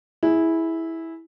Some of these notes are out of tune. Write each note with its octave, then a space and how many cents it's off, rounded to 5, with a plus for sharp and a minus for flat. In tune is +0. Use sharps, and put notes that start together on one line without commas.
E4 -10 G#4 +0